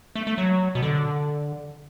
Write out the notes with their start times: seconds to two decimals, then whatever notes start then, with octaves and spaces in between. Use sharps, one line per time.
0.16 A3
0.27 A3
0.38 F#3
0.75 B2
0.83 D3